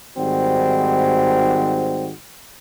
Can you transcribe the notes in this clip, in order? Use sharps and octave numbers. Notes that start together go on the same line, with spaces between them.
G#2 D#3 G3 C4 F#4